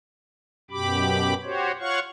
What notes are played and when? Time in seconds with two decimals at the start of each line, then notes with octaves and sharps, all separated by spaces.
0.71 F#2 B2 G4 B5 D6
1.43 F#4 G4 C5 C#5
1.79 F4 C#5 F5 F#5 C#6